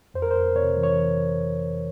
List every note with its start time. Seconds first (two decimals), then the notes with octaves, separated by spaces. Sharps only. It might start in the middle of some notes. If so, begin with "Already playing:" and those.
0.14 F2 C5
0.22 A#4
0.31 C5
0.36 F2
0.55 C3 C#5
0.77 E3
0.83 C#5